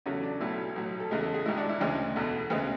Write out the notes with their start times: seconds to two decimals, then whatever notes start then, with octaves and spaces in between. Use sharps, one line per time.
0.06 E2 C#3 F#3 A3 C#4
0.23 D4
0.40 B1 B2 F#3 A3 E4
0.76 B1 A2 F#3
1.00 A4
1.11 E2 C#3 G#3 G#4
1.22 A4
1.34 G#4
1.46 G#1 G#2 G#3 E4
1.58 D4
1.69 E4
1.80 D2 C#3 G#3 D4
2.16 E2 B2 A3
2.50 D2 C#3 G#3 B3